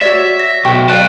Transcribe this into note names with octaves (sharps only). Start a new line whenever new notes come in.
F#4 C#5 D5 E5
A#6
B1 F#4 G5 C#6
D5 F5 G5 A5 C#6 F#6